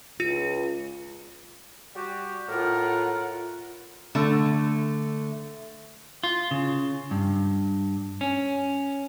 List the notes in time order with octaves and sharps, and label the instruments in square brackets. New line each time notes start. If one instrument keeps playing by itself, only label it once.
[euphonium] C#2 [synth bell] F4
[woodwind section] G3 F#4 G4
[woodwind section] A2 A#4 [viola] F4 F#5
[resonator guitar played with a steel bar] D3 A3
[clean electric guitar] F4
C#3
G2
C#4